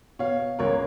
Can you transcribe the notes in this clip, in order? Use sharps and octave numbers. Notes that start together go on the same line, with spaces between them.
B2 C#5 F5
C#2 A#4 C#5